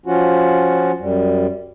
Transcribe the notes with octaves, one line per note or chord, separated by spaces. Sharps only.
F3 C#4 F4 F#4
F#2 G3